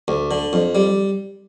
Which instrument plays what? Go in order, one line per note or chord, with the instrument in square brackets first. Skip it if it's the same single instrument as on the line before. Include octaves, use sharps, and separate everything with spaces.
[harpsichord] D2
D3
F2
G3